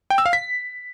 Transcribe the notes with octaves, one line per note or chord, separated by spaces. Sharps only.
G5
E6
F5
B6